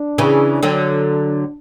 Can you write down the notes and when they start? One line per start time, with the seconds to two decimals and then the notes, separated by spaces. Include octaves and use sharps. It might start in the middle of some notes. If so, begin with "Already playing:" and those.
Already playing: D4
0.18 C#3 E3
0.63 D3 F#3